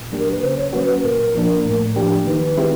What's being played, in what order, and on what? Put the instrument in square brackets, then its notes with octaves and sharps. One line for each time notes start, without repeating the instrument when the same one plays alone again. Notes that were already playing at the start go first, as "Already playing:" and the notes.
Already playing: [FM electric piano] A#2
F#3 A#3 D4 G4
[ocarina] A#4
B4
[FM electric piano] C#3 [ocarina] C5
[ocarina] C#5
[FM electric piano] F#3 A#3 C#4 F#4 [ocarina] B4
[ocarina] B4
[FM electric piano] A#2 [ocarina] A#4
[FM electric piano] F3 A#3 D4
A2
F3 A#3 D4 G4
[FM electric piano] D#3 [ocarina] B4
[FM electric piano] G#3 C4 E4 G4